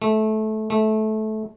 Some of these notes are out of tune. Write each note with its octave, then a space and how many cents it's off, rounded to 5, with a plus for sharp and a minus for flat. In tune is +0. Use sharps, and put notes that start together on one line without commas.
A3 -20
A3 -20